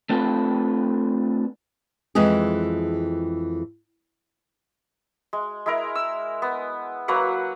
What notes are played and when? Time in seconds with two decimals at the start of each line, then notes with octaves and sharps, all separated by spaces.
0.10 A3 C4 D4 F4 A4 B4
2.15 F2 E3 G#3 G#4
5.33 G#3
5.66 G#3 E4 A#4
5.95 E6
6.42 B3
7.08 F#3 A#3 B4 F#5